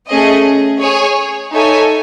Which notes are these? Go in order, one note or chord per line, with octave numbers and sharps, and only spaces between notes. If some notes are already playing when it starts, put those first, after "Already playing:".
A3 C#4 G#4 D#5
G#4 C#5 G#5
D#4 A4 C#5 E5 G#5